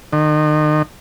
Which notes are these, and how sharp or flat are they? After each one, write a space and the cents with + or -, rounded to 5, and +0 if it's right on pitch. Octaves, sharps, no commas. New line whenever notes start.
D#3 -35